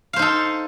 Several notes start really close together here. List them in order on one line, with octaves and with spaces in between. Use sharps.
F5 C5 D#4 A4